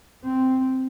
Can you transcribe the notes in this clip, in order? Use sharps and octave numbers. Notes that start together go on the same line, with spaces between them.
C4